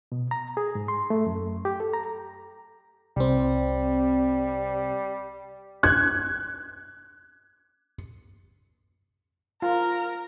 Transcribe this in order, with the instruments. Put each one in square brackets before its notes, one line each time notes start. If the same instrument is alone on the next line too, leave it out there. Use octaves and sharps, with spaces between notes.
[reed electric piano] B2
A#5
G#4
G#2
C6
A3
F#2
G4
A4
A#5
[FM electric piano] C2 C4 [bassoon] G3
[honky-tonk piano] F#6 G#6
[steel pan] F4 [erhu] A#4